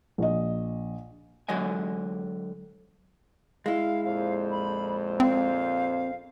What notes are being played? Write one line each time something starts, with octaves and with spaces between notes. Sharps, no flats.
A#1 D#5
D3 F#3 G#3 D#5 G#5
G#3 E4 F5
A#1 F2 C5 F5
B5
C4 F5